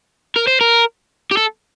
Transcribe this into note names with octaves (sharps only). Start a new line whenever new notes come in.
A#4
C5
A#4
G4
A4